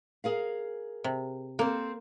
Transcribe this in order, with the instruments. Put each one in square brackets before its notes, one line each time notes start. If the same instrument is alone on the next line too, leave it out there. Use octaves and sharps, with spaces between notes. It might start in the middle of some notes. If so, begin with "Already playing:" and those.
[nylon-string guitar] G#4 A#4 F5
[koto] C3
[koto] A#3 [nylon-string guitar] C4 A4